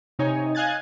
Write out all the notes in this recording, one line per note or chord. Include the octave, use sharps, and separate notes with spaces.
C3 D#4 C#5 G#5
D#5 F5 G#5 F#6 G#6 A6